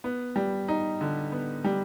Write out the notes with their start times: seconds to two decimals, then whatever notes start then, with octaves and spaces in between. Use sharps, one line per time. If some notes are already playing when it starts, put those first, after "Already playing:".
0.04 B3
0.36 G3
0.68 D#4
1.01 D3
1.32 B3
1.64 G3